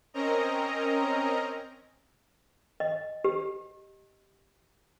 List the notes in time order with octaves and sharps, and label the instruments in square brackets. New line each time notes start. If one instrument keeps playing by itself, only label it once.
[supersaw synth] C4 C#4 A#4 D#5 A#5
[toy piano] D#5
G4